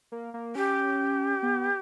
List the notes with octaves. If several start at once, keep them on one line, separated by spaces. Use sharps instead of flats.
A#3
A#3
C#4 G4
B3